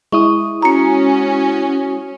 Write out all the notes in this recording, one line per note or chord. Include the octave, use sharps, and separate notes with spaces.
G#3 E4 C#6 D#6
C#4 F#4 A#5 C#7